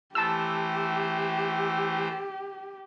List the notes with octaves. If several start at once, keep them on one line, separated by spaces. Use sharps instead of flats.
E3 A3 G4 C5 A5 E6